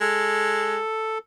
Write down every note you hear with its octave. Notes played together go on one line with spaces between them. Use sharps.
G#3 A4